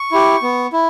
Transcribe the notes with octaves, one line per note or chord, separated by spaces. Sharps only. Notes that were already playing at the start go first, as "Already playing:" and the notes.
Already playing: C#6
E4 G4
B3
E4